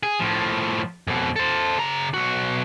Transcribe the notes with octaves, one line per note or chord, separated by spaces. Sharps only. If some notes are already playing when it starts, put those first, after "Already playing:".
G#4
A2 F3
F2 B2
A4 C5
C#3 A#5
B1 F#4